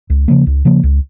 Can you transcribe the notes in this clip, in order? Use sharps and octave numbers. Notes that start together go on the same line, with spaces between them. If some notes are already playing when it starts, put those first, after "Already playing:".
C#2
C#3 F3 A#3
C#2
C#3 F3 A#3
C#2